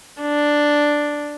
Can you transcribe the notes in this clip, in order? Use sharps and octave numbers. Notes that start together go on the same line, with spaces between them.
D4